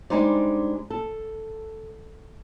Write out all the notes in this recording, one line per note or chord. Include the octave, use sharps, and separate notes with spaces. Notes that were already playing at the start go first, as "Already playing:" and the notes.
G3 G#3 D4 D#4 C5 D5
A4